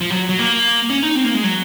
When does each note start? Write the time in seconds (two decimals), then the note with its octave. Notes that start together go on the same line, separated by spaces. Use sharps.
0.01 F3
0.10 F#3
0.29 F#3
0.39 A#3
0.90 C#4
1.03 D#4
1.16 C4
1.24 A#3
1.34 G#3
1.44 F#3